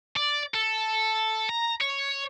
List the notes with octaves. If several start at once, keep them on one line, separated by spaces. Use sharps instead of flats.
D5
A4
A#5
C#5